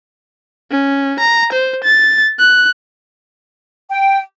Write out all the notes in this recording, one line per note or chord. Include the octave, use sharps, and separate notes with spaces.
C#4
A#5
C5
A6
F#6
G5